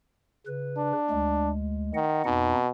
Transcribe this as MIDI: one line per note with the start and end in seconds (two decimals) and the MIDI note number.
0.47 0.92 49
0.47 0.92 71
0.77 1.50 62
1.10 1.91 38
1.10 1.91 56
1.94 2.21 51
1.94 2.25 75
1.94 2.25 78
2.25 2.53 41
2.25 2.70 47
2.25 2.53 63